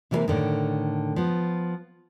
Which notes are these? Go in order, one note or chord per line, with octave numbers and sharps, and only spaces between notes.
C3 E3 G3 G#3 A#3 C4
A2 D3 D#3
F3 B3